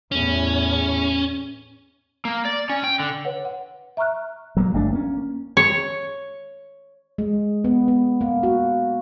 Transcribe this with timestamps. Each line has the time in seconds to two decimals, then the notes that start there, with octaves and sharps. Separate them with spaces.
0.12 E2 A2 C#4
2.25 A#3
2.45 D5
2.70 C#4
2.84 G5
3.00 D3
3.25 B4 C#5 F#5
3.45 F#5
3.97 E5 A#5 C#6 F6 F#6
4.57 F#3 G3 A#3
4.74 G1 A3 C4 D4
4.93 A#3 C#4
5.57 C#5
7.18 G#3
7.64 B3
7.88 B3
8.21 A#3
8.43 F#4